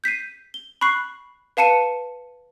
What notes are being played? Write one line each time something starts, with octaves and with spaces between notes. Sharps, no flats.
G6 B6 C7 D#7
G7
B5 C#6 F#6 C7
B4 F5 A5 C#7 D#7